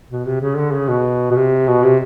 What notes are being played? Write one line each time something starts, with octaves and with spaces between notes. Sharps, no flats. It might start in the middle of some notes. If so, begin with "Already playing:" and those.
B2
C3
C#3
D3
C#3
B2
B2
C3
B2
C3